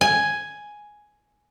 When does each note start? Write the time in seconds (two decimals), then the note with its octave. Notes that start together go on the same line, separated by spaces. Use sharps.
0.01 G#5